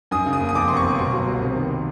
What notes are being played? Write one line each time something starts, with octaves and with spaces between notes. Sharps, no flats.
F#2 D#6
C#3
D#6
F#1
D#6
F2 D6
C3 C6
C#6
G1
B2 C6
F#3
C2
C3
D#3